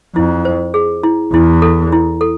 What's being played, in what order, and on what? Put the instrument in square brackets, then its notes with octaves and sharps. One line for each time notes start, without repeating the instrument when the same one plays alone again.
[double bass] F2 [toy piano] E4
[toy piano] C5
G#4
E4
[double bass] E2 [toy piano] E4
[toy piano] A4
E4
A4